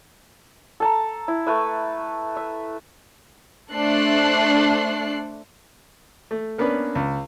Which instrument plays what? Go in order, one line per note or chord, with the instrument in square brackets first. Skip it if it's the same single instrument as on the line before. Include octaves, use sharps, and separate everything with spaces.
[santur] A4 A5 A#5
E4
A3 B4 E5
E5
[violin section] A3 D4 A4 C5 F#6 C7
[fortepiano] A3
A#3 B3 C#4 D4 B4
C#2